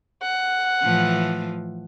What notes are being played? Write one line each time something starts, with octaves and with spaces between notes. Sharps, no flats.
F#5
A2 E3 F3